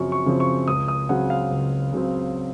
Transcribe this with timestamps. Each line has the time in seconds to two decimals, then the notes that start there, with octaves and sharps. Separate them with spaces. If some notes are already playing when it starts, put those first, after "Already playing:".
Already playing: F#2 C#3 F3 C4 C#6
0.12 C#6
0.26 C#3 F3 C4
0.40 C#6
0.68 C#2 D#6
0.88 D#6
1.09 C#3 F#3 C4 F#5
1.30 F5
1.51 C#2
1.93 C#3 F#3 C4